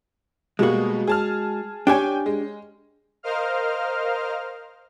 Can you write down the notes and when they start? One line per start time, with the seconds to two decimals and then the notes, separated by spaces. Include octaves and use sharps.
0.59 B2 G3 G#3 A#3 F#4
1.07 G#4 A5 F6
1.87 D4 G4 C#5 G5 G#5
2.26 G#3
3.23 A#4 C5 D#5 F5 F6